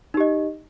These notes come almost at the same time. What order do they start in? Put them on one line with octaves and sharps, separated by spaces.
D#4 G4 D#5